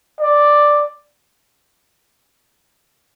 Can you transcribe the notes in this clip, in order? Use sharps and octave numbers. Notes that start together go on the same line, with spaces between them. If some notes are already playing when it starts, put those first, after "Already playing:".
D5